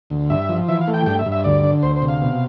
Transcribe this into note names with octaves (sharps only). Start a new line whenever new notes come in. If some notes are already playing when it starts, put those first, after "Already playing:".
D2
G2 E5
F3
E3 E5
F5
A3
G5
G2 G5
E5
G2
E5
D2 D5
D3
D2 C5
C5
C3
F5
B2